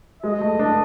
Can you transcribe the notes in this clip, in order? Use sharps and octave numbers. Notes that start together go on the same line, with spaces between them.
G#3 D#5
A3
D4